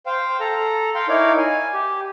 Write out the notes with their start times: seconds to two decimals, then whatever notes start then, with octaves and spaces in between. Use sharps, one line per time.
0.06 C5 F5 G5
0.40 A4 A#5
0.95 F5 G5 C6
1.09 D#4 E4 A#4 C#5 D5 F5
1.38 G#5
1.74 G4